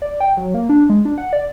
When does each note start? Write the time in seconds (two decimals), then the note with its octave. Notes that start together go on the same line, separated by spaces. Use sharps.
0.02 D5
0.20 G5
0.37 F#3
0.54 A#3
0.69 D4
0.89 G#3
1.05 D4
1.18 F#5
1.33 D5